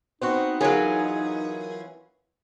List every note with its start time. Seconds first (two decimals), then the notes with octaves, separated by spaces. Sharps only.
0.22 B3 C4 D#4 F#4 C5 F#5 C#6
0.60 E3 F#3 C#4 F4 G#4 A#4 G#5 G#6